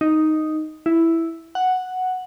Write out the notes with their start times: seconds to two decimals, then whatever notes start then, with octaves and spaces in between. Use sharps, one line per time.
0.01 D#4
0.86 E4
1.55 F#5